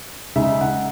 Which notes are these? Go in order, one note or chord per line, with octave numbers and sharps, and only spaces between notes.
C#3 G#3 D#4 E5
F#5